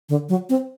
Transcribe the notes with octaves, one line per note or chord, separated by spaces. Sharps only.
D3
F#3
C4